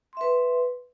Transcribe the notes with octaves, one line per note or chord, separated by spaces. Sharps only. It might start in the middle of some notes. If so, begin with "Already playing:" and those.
B4 E5 C6